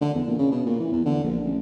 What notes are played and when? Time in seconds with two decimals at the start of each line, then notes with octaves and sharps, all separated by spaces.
0.01 D3
0.14 E2
0.27 A#2
0.39 C#3
0.52 B2
0.66 A#2
0.80 E3
0.92 E2
1.05 D3
1.24 A#1
1.45 A1